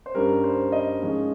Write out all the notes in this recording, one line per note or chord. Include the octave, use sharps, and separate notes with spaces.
C5
G2 G3 C#4 A#4
C5
D#5
G#2 F3 G#3 C#4